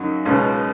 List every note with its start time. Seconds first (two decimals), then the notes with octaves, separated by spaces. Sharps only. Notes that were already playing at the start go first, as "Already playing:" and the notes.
Already playing: F#2 C#3 F#3 D#4
0.25 C#2 B2 G#3 C#4 F4